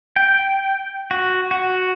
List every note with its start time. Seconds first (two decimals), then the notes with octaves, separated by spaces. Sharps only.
0.16 G5
1.11 F#4
1.51 F#4